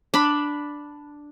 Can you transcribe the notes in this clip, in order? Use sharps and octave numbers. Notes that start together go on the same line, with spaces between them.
D4 B5